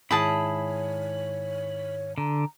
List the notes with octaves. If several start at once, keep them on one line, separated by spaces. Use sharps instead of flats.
G#2 D#3 E4 G#4 C#5 A5 B5
D3 A#5